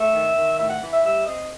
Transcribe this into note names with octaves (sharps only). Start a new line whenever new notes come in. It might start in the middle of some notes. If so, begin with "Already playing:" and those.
Already playing: A3 E5
D#3
D#3
A2 E5
F#5
E3
E5
G3 E5
C4 D#5